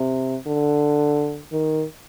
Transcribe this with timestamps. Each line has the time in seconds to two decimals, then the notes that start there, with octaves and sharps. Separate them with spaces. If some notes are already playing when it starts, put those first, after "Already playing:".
Already playing: C3
0.47 D3
1.52 D#3